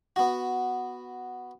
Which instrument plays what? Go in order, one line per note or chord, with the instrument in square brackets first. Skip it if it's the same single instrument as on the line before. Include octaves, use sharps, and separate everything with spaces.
[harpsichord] B3 F#4